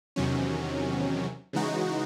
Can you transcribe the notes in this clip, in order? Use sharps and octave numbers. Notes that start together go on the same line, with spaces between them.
E2 C3 D#3 F#3 C#4
C#3 E3 G#3 D#4 F#4